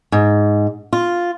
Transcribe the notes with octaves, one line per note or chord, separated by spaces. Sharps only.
G#2
F4